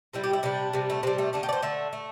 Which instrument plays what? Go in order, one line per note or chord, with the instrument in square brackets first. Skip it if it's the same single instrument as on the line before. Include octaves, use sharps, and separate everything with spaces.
[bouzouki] C3 G3 E4
G4
E4
C3 G3 D4
C3 G3
A3
C3 G3 C4
A3
D3 A3 D4
G4
D5
C5
D3 A3 E5
A3